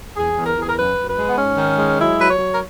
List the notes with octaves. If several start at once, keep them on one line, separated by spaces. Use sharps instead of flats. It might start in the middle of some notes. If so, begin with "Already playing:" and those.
E2 G#4
E2
A#4
E2
G#4
A#4
F#2 B4
F#2
B4
G#3
B3
G#2 C#4
D#3
G#3
F#3 E4
F#3 B4
C#5
F#3
A#4